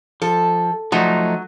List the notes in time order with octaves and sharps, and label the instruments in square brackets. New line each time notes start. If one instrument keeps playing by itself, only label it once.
[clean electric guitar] F3 [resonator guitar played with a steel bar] A4
[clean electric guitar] F3 A3 D#4 [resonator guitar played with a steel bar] F#3